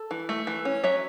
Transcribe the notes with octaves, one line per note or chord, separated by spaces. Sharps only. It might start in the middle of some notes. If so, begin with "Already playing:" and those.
Already playing: A4
E3
A3
E3
C#4
F#3 C#5 E5